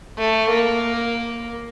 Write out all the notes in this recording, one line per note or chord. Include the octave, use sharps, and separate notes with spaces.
A3
A#3